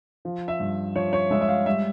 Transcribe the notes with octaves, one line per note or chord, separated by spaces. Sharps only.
F3
E5
G2
F3 C#5
C#5
G#3 E5
E5
F5
G3 E5